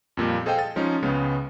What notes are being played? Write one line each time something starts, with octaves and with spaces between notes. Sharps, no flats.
F2 A#2 G3
G#4 A4 C5 D#5 F5 G5
A6
F3 G#3 C#4 D#4
C#2 C#3 G#3 B3